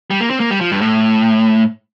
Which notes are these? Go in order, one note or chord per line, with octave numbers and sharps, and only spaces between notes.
G3
A#3
C4
A#3
G3
F3
G2
A2